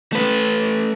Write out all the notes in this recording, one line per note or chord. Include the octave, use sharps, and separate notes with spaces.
A3 B4